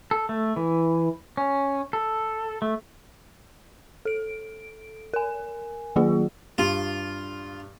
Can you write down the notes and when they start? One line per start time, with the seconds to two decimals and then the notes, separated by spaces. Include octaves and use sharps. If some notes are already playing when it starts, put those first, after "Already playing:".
0.11 A4
0.29 A3
0.56 E3
1.37 C#4
1.93 A4
2.62 A3
4.05 A4 D7
5.14 A#4 G#5
5.96 D#3 F#3 A#3 F4 G#4
6.58 G2 F4